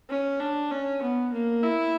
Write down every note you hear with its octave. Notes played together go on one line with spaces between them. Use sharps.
C#4
D4
C#4
B3
A#3
E4